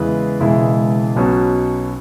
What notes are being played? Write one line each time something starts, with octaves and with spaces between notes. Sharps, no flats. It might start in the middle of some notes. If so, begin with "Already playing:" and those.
Already playing: E2 C#3 G#3 E4 B4
E1 E2 C#3 G#3 E4
B1 B2 F#3 C#4